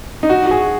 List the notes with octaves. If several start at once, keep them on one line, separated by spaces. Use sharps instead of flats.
D#4
F#4
F#4
G#4